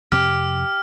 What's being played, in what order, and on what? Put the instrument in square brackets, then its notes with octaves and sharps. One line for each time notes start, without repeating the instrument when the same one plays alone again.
[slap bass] F2 C3 C4 [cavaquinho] G4 [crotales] F6